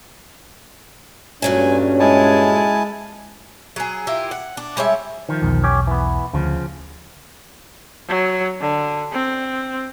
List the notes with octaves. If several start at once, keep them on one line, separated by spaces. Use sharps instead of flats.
G2 A#2 F#3 A3 C#4 G#5
G#3 E4 G#5 A5
F#3 G#4
E4 F4 G4 A#4
F#5
D4
G3 G#3 C#5 E5
D#3 F3
B1 E2
C#4 G4
E3 B3
D2 C#3 F3
F#3
D3
C4